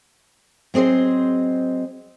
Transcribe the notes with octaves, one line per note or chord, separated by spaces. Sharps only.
F#3 C4 G#4 C5 D#5